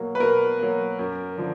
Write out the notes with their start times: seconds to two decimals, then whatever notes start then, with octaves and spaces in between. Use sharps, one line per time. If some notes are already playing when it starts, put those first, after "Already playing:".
Already playing: B2 F#3 A#3
0.15 B4
0.20 B2 A#4
0.59 F#3 A#3
0.99 F#2
1.37 D3 F3